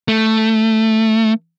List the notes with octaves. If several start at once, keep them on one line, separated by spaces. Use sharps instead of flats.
A3